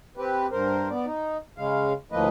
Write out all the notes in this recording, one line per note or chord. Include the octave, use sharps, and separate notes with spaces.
C4 G4 B4
G2 A#4 C5
B3 D5
D#4
C#3 G#3 F5
D2 A2 F3 A#3 B4 D#5